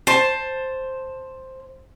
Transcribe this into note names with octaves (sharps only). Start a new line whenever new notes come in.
C5 A5